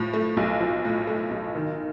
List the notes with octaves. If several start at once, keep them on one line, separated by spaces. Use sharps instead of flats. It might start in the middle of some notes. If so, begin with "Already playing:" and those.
Already playing: A2 F3
A3
B1
F3
A2
A3
B1
D#3